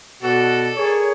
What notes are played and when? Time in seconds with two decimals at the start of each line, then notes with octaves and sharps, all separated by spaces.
0.22 B2 F#4 A4 D5
0.76 G#4 A#4 C#5